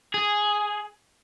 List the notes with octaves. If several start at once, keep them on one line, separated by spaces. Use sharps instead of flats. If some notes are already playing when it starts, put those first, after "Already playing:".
G#4